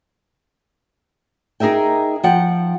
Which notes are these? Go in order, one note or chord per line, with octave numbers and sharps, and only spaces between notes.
D#4 G#4 A#4 E5 G5
F3 F#5 G5